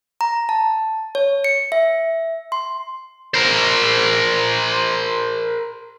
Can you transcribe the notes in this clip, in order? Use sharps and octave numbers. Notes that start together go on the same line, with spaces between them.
A#5
A5
C#5
C#7
E5
C6
A#4 C5